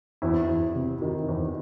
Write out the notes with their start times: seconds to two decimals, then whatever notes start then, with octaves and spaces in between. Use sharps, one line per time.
0.22 E2 E4
0.49 E2
0.75 C3
1.02 D#3
1.29 E2